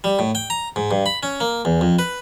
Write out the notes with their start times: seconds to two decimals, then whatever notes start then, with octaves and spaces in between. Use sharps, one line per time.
0.04 G3
0.19 A2
0.35 G5
0.50 A#5
0.76 G#2
0.91 G2
1.06 B5
1.23 C#4
1.41 A#3
1.65 E2
1.81 F2
1.99 B4